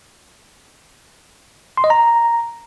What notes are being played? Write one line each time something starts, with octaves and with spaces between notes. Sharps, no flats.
C6
D#5
A#5